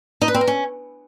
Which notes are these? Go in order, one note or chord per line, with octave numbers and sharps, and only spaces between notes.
D#4
B4
C4
A#4
C#4